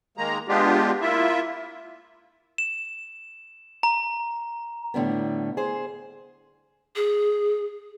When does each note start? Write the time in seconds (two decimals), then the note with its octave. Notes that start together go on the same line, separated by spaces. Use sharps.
0.17 D#3 G#3 A#3 A#5
0.48 G#3 B3 D4 F4 G4
1.01 A#3 E4 F4 E5
2.58 E7
3.83 A#5
4.94 A2 D3 G3 B3
5.57 G#4 C5
6.95 G#4